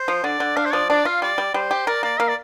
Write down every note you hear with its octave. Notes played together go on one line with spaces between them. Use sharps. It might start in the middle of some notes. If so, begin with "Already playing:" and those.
Already playing: C5
F3
D3 D5
D3
D4 F5
C5
F3 D5
D4 D5
F4 F5
G3 D5
G3
G3 C5
G4
A#4 D5
A#3 D5
A#3 F5
D5